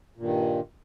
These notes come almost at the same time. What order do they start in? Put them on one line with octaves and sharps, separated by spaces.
A#2 G2 D#3